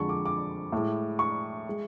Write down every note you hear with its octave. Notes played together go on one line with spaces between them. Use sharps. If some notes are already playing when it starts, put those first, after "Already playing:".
Already playing: F2 D3 G#3 A5 C#6
D6
D6
A2 G#3
C#6
G#3